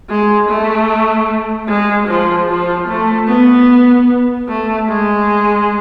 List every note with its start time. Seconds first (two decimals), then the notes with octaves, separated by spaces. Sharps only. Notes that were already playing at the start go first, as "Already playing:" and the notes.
0.09 G#3
0.49 A3
1.68 G#3
2.07 F3
2.48 F3
2.88 A3
3.28 B3
4.48 A3
4.88 G#3